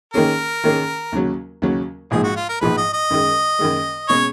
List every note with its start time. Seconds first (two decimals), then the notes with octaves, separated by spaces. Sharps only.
0.14 D#3 A#3 C#4 G#4 A#4
0.64 D#3 A#3 C#4 G#4
1.12 D#2 C#3 F#3
1.62 D#2 C#3 F#3
2.11 A#1 G#2 F3 G#3 G#4
2.24 F#4
2.36 F4
2.49 A#4
2.61 A#1 G#2 F3 G#3 B4
2.77 D#5
2.94 D#5
3.10 F#2 D#3 G#3
3.59 F#2 D#3 G#3
4.09 B2 G#3 C#4 G#4 C#5